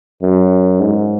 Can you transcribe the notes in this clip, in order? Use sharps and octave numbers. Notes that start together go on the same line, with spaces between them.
F#2
G#2